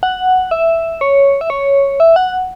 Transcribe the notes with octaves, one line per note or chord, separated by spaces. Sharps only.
F#5
E5
C#5
E5
C#5
E5
F#5